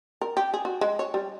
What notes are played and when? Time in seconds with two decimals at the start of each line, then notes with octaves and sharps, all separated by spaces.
0.21 A#4
0.37 G4
0.54 G#4
0.65 F#4
0.81 G#3
0.99 C#5
1.14 G3